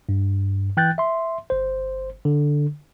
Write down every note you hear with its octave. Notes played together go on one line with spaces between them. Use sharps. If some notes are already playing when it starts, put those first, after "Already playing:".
G2
E3 G5 F#6 G6 A6
E5 C6
G1 C5
D3